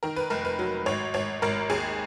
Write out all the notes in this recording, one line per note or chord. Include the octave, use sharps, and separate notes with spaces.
D#3 A#4
B4
F1 A#4
B4
F#3
G#1 C#5
G#1 C#5
G#1 A#4
D#2 G#4